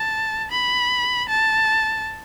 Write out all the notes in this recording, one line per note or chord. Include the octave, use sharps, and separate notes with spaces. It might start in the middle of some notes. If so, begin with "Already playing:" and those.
Already playing: A5
B5
A5